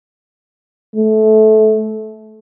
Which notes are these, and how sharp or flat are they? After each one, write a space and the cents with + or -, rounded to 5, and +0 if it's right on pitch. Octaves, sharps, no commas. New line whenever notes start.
A3 -20